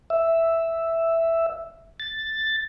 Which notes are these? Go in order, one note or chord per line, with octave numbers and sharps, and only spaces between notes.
E5
A6